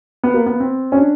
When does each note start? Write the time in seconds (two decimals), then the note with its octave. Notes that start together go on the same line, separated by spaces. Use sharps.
0.23 B3
0.34 A#3
0.46 B3
0.60 C4
0.92 C#4
0.97 D4